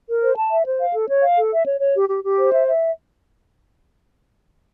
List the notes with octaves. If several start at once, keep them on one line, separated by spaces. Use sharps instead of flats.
A#4
C5
A5
E5
C5
F5
A4
C#5
F5
A4
E5
C#5
C#5
G4
G4
G4
C5
E5
E5